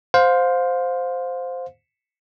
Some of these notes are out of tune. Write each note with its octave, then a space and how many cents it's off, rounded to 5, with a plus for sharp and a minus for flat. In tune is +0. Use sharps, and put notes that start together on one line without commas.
C5 -5 F5 +25